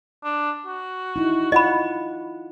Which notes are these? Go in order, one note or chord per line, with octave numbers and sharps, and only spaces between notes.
D4
F#4
D#4 E4
F4 D#5 F#5 B5